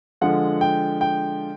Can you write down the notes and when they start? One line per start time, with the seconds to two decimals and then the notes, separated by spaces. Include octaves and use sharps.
0.21 D3 F3 G#3 F#5
0.61 G5
1.01 G5